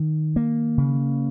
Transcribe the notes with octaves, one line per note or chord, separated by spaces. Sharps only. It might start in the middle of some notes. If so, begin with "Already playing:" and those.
Already playing: D#3
A#3
C#3